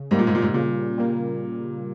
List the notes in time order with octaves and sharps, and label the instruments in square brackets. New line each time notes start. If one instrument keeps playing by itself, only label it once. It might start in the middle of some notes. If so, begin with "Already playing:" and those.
Already playing: [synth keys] C#3
[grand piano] G#2 [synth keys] G3 A#3
[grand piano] A#2
G#2
A#2
G#2
[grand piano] A#2 [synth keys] C#3
[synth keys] G3 A#3